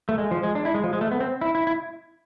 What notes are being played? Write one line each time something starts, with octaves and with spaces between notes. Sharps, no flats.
A3
G#3
F3
G#3
D4
E4
G#3
F3
G#3
A3
B3
C4
E4
E4
E4